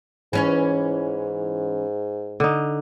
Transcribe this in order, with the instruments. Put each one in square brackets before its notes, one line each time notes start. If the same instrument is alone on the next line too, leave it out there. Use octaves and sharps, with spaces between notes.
[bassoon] G#2 [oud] E3 C#4 C#5
[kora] D3 D#4